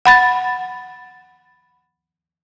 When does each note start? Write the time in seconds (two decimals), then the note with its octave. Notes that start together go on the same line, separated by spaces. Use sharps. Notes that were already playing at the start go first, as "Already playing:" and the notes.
0.05 F#5 B5 A6